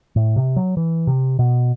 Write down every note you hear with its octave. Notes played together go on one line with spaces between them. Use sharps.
A2
C3
F#3
E3
C3
B2